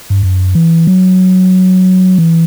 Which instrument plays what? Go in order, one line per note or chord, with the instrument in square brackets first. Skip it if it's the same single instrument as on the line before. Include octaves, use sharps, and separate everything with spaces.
[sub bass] G2
F#2
E3
F#3
E3